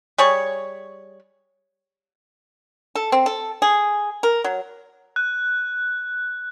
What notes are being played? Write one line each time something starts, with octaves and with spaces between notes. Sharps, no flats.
G3 G#4 C#5
A4
C4
A4
G#4
A#4
F#3
F#6